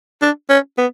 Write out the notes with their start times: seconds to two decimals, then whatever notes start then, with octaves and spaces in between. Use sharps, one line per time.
0.22 D4
0.50 C#4
0.78 B3